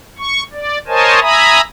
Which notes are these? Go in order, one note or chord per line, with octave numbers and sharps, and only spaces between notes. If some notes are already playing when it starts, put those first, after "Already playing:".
C#6
D5
A#4 C5 C#5 D#5 G#5 A5
E5 G#5 A#5 B5 D#6